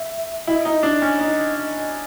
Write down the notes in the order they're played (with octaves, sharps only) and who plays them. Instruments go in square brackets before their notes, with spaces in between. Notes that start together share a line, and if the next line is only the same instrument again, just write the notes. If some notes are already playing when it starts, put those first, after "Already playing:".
Already playing: [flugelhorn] E5
[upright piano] E4 [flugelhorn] D#5
[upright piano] D#4
[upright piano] D4 [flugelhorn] D5
[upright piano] C#4
[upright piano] D#4 [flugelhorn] D#5
[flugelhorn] D#5